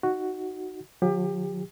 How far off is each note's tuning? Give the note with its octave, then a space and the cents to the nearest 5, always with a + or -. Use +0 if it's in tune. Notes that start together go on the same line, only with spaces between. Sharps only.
D#4 +0 F#4 +0
D3 +45 F#3 -35 G4 +30